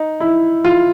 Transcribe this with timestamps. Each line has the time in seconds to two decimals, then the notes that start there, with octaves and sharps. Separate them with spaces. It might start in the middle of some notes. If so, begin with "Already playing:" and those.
Already playing: D#4
0.20 E4
0.65 F4